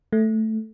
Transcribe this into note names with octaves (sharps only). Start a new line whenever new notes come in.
A3